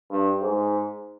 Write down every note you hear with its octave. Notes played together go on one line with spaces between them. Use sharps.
G2
G#2